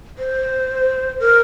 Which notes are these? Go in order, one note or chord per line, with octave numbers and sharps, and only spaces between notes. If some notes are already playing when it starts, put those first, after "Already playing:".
C5
A#4